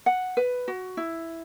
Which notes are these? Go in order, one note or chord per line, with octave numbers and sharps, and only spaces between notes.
F#5
B4
F#4
E4